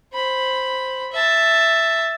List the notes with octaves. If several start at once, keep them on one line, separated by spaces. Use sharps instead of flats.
C5 B5
E5 A5